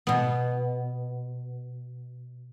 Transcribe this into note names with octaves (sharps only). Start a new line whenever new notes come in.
B2 B3